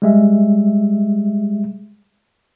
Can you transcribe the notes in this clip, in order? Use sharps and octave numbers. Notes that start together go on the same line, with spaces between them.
G3 G#3 E5